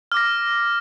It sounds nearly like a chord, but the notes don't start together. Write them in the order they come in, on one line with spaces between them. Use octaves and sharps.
F6 D6 A#6